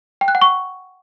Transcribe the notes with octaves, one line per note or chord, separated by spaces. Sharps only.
G5
F#6
F#5
C#6